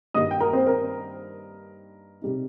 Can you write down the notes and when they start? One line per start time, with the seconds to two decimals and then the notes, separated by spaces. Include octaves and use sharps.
0.14 G2 D#3 G3 A#3 D#4 D#5 D#6
0.31 G5
0.40 A#4 A#5
0.53 C4 C5
0.67 A#4
2.22 C3 G3 D#4